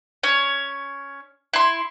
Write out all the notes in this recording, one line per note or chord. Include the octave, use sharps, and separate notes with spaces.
C#4 C#5
E4 C6